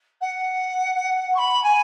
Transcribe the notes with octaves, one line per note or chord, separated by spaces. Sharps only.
F#5
C#6
B5
G#5